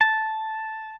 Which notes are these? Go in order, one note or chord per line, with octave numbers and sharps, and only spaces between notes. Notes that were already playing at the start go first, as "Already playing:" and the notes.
A5